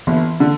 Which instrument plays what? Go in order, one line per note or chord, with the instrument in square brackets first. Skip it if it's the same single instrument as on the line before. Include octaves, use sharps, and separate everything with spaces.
[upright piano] G1 [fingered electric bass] E3
[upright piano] D3